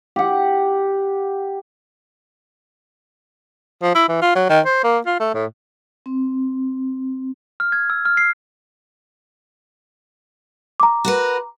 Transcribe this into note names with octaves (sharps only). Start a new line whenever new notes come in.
G4 F#5
F3
E4
E3
F4
F#3
D#3
C5
A#3
F4
A3
A2
C4
F6
G#6
E6
F6
C7
A#5 D6
F#4 A#4 B4